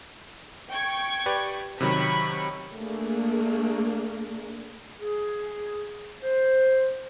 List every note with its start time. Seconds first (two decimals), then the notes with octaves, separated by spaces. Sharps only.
0.70 G5 C#6 G#6
1.26 G4 B4 D5
1.81 C3 D#3 F#3 B5 C#6
2.74 A3 A#3 D4 G#4 A#4
5.00 G#4
6.22 C5